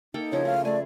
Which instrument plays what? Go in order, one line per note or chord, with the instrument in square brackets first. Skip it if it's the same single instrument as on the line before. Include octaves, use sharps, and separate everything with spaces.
[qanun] A#3 A4 G5 [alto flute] D#4
[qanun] C#3 F3 E4 [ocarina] C#5
[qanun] A3 [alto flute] F5
[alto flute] A3 [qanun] G#4 G#5 [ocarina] D5